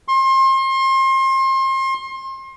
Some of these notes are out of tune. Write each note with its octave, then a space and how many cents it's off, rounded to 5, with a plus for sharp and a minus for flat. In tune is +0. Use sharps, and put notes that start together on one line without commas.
C6 +35